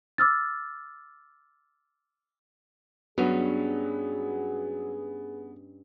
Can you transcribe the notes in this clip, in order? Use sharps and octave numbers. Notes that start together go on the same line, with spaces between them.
D6 E6 F6 A6
G2 F#3 B3 C#4 G#4 B4